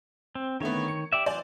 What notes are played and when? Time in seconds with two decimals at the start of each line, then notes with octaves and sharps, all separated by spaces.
0.35 C4
0.60 D3 D#3 A3 B3 C#5
0.88 C#7
1.13 G4 D5 E5
1.26 E3 F#3 C5 D5 G#5